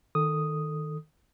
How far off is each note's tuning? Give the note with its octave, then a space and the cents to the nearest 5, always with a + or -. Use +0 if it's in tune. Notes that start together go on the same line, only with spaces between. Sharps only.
D#3 +0 A4 +0 D#6 +0